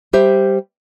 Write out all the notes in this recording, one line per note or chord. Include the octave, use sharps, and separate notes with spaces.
G3 G4 C5 E5